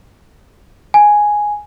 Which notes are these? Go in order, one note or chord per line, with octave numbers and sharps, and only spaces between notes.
G#5